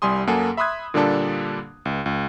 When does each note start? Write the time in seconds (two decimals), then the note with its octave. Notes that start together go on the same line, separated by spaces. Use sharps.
0.02 C2 G3 G#5 C6 D#6
0.27 F#2 A#3 A4 F#5 G#5
0.57 E5 B5 C6 D#6 F#6 G#6
0.94 A#2 D3 G3 A#3 D4 A4
1.85 C#2
2.06 C#2